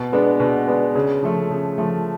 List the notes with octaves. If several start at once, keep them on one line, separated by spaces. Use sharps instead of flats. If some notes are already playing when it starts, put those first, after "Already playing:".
Already playing: B2
G#3 B3 D4
B2
G#3 B3 D4
C#3
F3 A3
C#3
F3 A3